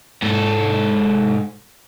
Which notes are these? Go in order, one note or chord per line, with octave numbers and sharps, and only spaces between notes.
G#2 A4